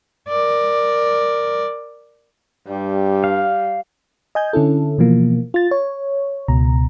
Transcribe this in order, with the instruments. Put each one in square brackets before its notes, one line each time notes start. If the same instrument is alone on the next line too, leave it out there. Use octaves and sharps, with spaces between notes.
[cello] A#4 D5
[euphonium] G2 [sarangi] G3
[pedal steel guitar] F5
[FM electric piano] D#5 G#5 G6
D3 C#4 E4 A4
B2 E3 F3 A#3
F4 A6
C#5
C#2 B2 A#5